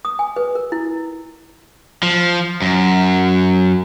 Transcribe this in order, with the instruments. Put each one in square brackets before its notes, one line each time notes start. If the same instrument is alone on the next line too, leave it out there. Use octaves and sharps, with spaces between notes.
[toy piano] D#6
G#5
B4
A#4
E4
[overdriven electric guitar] F3
F#2